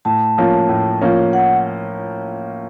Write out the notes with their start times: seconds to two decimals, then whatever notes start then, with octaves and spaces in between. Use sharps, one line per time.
0.05 A2 A5
0.38 F3 A#3 C#4
0.69 A2
1.01 F3 A#3 C#4
1.33 F#5